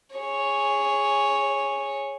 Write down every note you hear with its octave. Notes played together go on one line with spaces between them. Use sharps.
G#4 C#5